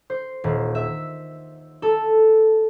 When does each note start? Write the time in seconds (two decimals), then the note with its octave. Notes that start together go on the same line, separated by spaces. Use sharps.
0.10 C5
0.44 D#1
0.75 E5
1.82 A4